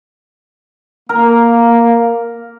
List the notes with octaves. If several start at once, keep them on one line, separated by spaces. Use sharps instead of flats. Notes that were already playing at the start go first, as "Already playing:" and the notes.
A#3 A#4